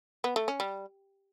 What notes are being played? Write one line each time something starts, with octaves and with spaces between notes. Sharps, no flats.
B3
A3
C#4
G3